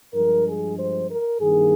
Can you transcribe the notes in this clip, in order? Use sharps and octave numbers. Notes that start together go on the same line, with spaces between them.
G2 F3 G#3 A#4
G#4
C5
A#4
G2 D#3 A#3 G#4